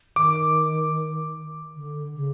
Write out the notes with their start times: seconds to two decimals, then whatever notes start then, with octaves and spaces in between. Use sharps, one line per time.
0.16 D#3 D6
1.75 D3
2.15 C#3